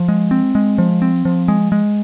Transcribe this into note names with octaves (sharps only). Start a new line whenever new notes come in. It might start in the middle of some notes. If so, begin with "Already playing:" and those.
Already playing: F3
G#3
C4
G#3
F3
C4
F3
G#3
G#3